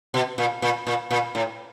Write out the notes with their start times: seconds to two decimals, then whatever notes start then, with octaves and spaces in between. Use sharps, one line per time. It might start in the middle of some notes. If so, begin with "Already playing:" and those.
0.14 B2
0.38 A#2
0.62 A#2
0.87 A#2
1.11 A#2
1.35 A2